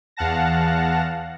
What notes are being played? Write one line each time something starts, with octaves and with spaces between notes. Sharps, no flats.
E2 F5 F#5 A5 A#6